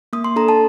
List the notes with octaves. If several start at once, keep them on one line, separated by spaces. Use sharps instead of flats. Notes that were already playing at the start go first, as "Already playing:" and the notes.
A#3 D#6
C6
D4 A4 A#5
A5